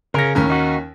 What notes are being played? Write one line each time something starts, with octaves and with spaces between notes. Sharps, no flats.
C#3 C#4 A#4 A#6
D#2 A2 C#4 A#4
D#4 F#4